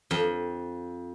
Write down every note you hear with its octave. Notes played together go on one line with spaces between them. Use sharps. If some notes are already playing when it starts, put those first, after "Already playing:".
F2